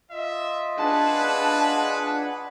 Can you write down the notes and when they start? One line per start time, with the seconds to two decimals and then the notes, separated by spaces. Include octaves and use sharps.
0.11 F4 D#5 E5
0.78 D4 G#4 B4 F#5 A5